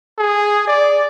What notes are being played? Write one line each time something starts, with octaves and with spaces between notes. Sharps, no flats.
G#4
D5